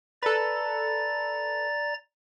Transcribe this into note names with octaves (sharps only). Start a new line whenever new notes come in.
A4 B4 D5 A#5 A6